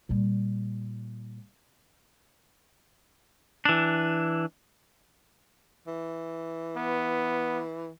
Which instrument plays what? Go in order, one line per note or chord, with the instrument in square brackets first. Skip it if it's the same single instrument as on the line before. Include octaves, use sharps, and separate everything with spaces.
[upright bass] A#2 G3
[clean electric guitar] E3 D4
[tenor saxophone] E3
[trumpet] B3